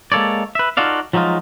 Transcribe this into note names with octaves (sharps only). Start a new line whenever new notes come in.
G#3 A#3 A4 C#5 D5
B4 E5
D#4 F4 F#4 A4 D5 F5
F3 F#3 G#3 D#4 F4